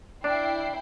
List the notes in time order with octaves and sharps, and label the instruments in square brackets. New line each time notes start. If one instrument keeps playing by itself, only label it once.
[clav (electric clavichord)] D4 [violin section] E4 G5 C7